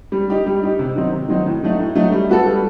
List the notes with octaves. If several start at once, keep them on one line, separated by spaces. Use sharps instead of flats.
G3
D#4 G4
G3
D#4 G4
C3
D#3 F#3 C4 D#4
C3
D#3 F#3 C4 D#4
A2
F#3 A3 D#4
A2
F#3 A3 D#4
G3
B3 F#4 A4
G3